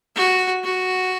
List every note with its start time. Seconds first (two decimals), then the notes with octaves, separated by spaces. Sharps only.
0.16 F#4
0.64 F#4